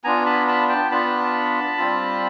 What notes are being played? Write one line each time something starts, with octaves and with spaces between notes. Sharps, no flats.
B3 D4 F4 G#5 A#5
A5 B5
A5 B5
G5 A5
B3 D4 F4 A5 B5
G3 C4 F4